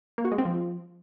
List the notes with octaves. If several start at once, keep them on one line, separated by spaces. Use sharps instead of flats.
A#3
F#4
G#3
C4
F3